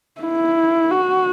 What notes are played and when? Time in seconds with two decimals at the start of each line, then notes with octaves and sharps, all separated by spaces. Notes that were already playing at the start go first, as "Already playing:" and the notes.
0.21 E4
0.91 F#4